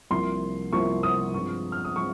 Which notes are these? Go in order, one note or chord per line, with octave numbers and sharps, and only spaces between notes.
C2 C3 F3 A#3 C6
C2 C3 F3 A#3 C#6
D#6
G2 F3 G#3 C4 F4 C#6
F6
D#6
G#3 C4 F4 C#6